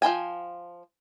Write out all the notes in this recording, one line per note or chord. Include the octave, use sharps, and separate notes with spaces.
F3 E4 G5 G#5